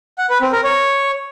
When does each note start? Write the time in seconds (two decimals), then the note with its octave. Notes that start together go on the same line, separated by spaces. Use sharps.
0.18 F#5
0.30 B4
0.41 C4
0.52 A#4
0.64 C#5